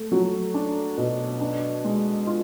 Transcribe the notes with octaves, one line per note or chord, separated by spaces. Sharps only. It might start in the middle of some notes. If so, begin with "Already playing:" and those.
Already playing: A3
F#3
D4
B2
D4
G#3
F4